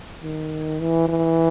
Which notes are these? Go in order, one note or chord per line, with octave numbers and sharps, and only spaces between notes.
D#3
E3
E3